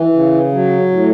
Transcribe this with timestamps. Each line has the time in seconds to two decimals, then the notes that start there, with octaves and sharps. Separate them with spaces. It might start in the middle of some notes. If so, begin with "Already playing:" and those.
Already playing: E3
0.13 C#3
0.52 F#3
0.91 A2